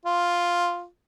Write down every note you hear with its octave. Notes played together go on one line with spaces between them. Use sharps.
F4